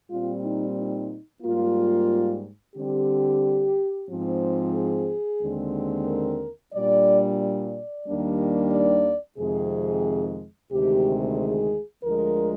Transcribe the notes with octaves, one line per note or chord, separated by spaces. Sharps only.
A#2 G3 C4 F4
D#4
D#4
G#2 G3 A#3 F4
D3 G3 C4 G4
G#2 F3 C4
G#4
D#2 D3 G#3 C4
A#4
A#2 G3 D4 D5
D5
D#2 D#3 G3 A#3 D4
D5
F2 C3 D#3 G#3 G#4
D2 C3 D#3 G#3 G4
G#4
D2 D3 F3 G#3 A#4